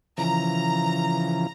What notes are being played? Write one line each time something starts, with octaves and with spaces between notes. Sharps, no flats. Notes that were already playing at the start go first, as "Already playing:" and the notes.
C#3 E3 F3 A#5